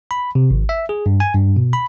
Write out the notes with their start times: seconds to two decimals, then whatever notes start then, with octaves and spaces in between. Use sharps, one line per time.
0.11 B5
0.35 C3
0.51 G#1
0.69 E5
0.89 G#4
1.06 G2
1.20 G#5
1.35 G2
1.56 B2
1.73 B5